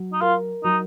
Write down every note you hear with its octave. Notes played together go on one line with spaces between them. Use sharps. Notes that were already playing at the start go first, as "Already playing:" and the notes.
Already playing: F#3
D#4
F4 A#4
F#3 D#4